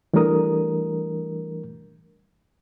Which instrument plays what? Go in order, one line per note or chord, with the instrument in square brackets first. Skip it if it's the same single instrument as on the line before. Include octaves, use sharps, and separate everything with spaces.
[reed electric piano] E3 G3 A3 D4 A#4 D#6